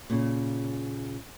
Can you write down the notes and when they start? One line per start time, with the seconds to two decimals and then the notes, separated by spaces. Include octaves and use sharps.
0.10 A#2 C#3